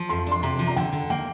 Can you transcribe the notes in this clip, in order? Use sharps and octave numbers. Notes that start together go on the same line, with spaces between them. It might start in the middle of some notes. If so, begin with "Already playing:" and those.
Already playing: F3
F2 C6
D4 C6
C3 A#5
F3
A#5
D3 G5
D3
A#3 G5